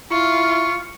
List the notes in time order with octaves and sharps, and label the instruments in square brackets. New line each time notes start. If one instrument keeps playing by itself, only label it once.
[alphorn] E4 [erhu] F4 [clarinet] C#6